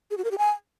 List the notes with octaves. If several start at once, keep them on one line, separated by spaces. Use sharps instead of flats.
G#4
F#4
A#4
G4
G#5